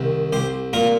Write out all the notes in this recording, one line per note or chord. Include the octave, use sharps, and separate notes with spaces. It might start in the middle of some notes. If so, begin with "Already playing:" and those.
Already playing: C2 D#3
C2 G4 C5
A#2 F4 A#4